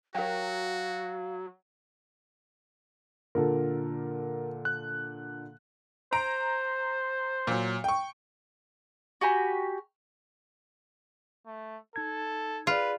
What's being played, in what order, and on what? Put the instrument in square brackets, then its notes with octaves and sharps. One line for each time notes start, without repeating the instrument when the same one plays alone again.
[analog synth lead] F#3 [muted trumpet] F#4 [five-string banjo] G4 A#4 [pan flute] F5
[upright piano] A#2 D3 A4 [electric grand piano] A#4
[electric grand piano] F#6
[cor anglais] C5 [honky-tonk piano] A#5 D7
[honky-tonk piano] A#2 F#3
G5 C#6
[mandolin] F#4 G4 G#5 B5
[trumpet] A3
[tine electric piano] D#4 G#6 [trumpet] A4
[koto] F4 [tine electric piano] G#4 D5 [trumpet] B4